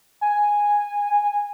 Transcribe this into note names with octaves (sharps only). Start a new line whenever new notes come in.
G#5